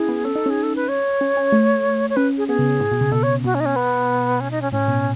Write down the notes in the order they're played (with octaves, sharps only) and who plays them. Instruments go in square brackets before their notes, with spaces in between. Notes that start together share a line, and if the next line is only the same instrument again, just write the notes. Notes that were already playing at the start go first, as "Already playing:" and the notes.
Already playing: [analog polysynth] C#4 E4 [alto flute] G#4
[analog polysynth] B3
[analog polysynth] C#4 [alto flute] A4
[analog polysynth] D#4
[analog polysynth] C#4 [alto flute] G#4
[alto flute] A4
B4
C#5
[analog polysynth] C#4
C#4
A3
[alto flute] C#5
[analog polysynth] C#4 [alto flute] B4
[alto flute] G#4
[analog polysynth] B3 [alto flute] G#4
[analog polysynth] C#3
A2
B2
C#3
[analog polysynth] B2 [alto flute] A4
[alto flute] C#5
[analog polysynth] B2 [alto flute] F#4
[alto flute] C#4
D#4
C#4
B3
C#4
D#4
C#4
[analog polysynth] A2 [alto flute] C#4
[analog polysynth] B2